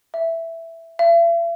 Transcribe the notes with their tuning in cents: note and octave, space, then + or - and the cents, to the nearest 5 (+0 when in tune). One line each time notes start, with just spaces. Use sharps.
E5 +5
E5 +45